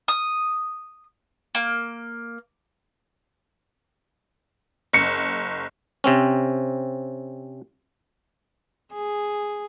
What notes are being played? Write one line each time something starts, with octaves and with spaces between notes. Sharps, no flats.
D#6
A#3
F#1 C#7
C3 C4 C#4
G#4